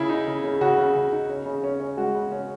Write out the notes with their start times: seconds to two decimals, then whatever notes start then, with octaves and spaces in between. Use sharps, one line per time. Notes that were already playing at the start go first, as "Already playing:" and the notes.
Already playing: C#3 E4 G#4
0.09 D#4
0.27 C#3
0.44 C#3
0.61 C#3 F#4
0.78 C#3
0.95 C#3
1.12 D#4
1.29 C#4
1.46 C#3
1.64 C#4
1.80 C#4
1.97 G#3 F#4
2.14 C#3
2.32 C#4